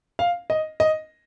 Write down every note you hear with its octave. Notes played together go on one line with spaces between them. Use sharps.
F5
D#5
D#5